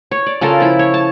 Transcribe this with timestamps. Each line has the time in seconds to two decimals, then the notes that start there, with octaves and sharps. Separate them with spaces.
0.11 C#5
0.26 D5
0.41 C#3 F4 A4 A#4
0.60 F3 E4
0.79 C#5
0.94 A5